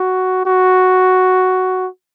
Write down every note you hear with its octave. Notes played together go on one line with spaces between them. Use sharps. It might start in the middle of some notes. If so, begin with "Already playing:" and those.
Already playing: F#4
F#4